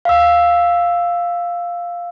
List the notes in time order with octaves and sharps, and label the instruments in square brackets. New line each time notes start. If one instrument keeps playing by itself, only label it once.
[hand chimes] F5 E6